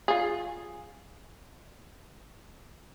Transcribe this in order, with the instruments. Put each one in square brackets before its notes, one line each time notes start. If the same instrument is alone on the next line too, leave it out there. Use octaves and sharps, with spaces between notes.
[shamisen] F4 G#4